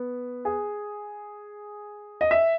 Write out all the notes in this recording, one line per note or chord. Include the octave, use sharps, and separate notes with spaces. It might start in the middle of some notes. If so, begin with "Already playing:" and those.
Already playing: B3
G#4
D#5
E5